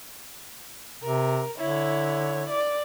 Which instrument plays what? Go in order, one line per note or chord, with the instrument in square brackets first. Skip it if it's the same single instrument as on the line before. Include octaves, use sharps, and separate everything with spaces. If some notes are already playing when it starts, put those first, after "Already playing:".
[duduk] C3 [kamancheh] A#4
[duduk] D3 [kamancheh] E4 C#5
[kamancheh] D5